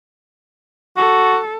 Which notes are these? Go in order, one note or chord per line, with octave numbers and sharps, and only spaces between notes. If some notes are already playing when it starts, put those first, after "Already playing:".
F#4 A4